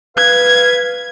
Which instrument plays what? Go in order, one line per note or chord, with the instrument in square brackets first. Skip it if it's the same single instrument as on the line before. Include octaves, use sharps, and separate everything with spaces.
[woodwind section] B4 F5 [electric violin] G#6